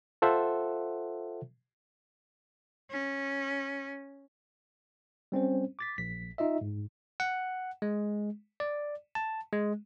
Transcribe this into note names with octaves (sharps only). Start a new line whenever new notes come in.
F4 A4 C5 E5 F#5
C#4
G3 C4 C#4 C5
D6 A6 B6
A#1 B6
D#4 F4 D#5 E5
G#2
F#5
G#3
D5
A5
G#3